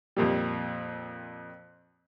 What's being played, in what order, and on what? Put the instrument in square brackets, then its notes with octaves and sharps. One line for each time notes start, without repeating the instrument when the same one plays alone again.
[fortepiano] F2 A#2 G3